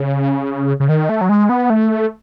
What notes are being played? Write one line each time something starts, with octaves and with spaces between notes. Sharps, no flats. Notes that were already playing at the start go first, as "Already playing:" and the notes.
Already playing: C#3
C#3
D#3
A3
F#3
G#3
B3
A3